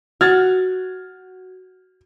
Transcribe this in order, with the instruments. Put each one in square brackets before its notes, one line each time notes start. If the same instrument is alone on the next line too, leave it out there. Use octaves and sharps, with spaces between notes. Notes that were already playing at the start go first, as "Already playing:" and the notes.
[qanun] F#4 [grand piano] F6 G#6 A6